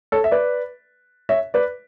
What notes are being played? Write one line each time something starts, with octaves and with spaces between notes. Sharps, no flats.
A4 C#5
E5
B4 D5
C#5 E5
B4 D5